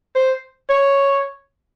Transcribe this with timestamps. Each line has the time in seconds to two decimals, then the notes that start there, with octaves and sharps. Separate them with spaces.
0.16 C5
0.70 C#5